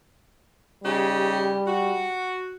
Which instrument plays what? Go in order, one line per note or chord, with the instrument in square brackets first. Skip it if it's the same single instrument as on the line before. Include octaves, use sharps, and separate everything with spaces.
[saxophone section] C#3 D#4 G4 [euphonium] G3
[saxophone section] F#4